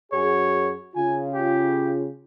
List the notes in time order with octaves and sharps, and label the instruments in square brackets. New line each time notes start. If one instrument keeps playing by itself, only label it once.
[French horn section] F#2 F#4 G#4 [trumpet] C#5
[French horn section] C#3 F4 [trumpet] G#5
[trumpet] G4